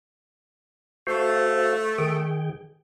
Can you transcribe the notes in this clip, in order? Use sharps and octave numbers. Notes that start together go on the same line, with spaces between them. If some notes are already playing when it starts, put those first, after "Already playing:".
A3 F#4 C5 F5
D#3 G#4 G5